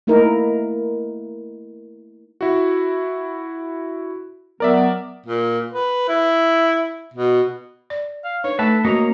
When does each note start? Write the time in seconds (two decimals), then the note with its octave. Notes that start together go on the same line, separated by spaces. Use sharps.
0.07 A3 A#3 D#4 E4 A#4
2.41 E4 F#4
4.60 F#3 B3 A#4 D5 E5
5.26 A#2
5.73 B4
6.08 E4
7.14 B2
7.90 D5
8.24 F5
8.44 D4 D#4 B4 C#5
8.59 A3 A4 B4 E5 A5
8.85 A#3 C#4 F#4 D#5 A#5